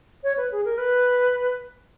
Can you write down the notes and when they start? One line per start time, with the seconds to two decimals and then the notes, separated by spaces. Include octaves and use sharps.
0.24 C#5
0.37 B4
0.52 G#4
0.65 A#4
0.78 B4